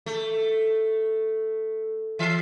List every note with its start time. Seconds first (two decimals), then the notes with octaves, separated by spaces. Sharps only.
0.06 A3
2.19 E3 E5